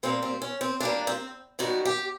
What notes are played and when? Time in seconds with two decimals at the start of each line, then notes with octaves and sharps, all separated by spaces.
0.03 A#2 G3 A#3 C4
0.23 C4
0.42 C#4
0.61 C4
0.80 A#2 G3 A#3 D4
1.07 C4
1.59 F#2 D#3 G3 F#4
1.85 G4